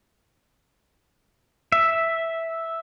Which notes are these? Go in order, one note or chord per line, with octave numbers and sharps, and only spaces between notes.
E5